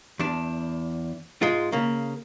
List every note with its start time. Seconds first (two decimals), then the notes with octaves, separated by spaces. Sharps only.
0.19 E2 D4
1.42 G#2 G#3 F4
1.72 C#3 A#3